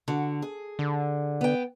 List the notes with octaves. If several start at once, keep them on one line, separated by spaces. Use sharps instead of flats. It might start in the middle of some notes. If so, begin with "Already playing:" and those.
D3 F#4
G#4
D3
B3 G5